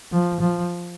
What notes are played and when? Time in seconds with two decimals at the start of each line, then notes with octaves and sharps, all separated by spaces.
0.12 F3
0.40 F3